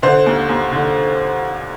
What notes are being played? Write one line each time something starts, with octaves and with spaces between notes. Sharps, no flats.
D3 C5
D#2
D#2
D3